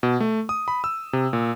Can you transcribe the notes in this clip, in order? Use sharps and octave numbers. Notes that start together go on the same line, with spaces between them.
B2
A3
D#6
B5
E6
C3
A#2